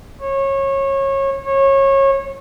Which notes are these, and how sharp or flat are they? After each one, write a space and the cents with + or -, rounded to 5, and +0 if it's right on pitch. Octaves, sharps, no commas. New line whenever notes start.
C#5 -25
C#5 -25